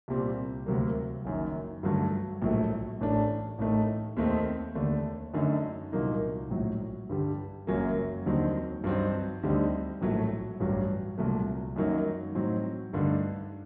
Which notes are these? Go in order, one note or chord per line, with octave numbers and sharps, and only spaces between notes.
C2 A#2 G3 C4
D2 C3 F#3 A#3
F#1 F#2 D#3
G2 D3 F#3 A3
A#1 A2 F#3 A3
A1 A2 A3 D4
A1 A2 A3 D#4
D#2 D#3 A3 C4 D#4
D#2 D3 A3 D4
F#2 D3 A3 D#4
C2 A#2 F#3 A#3 D#4
A#1 A2 F#3
G2 D3 G3
F#1 F#2 F#3 A#3
D#2 D3 F#3 C4 D#4
G2 F#3 C4 D#4
D2 D3 G3 C4 D#4
A#1 A2 F#3 A3
A1 G2 F#3
C2 A#2 F#3 A3
F#2 D#3 F#3 A#3 D#4
A2 F#3 C4 D#4
G2 D3 A3 D#4